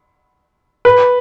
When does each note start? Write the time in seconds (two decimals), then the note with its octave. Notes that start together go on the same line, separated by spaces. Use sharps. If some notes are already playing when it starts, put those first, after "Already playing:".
0.85 B4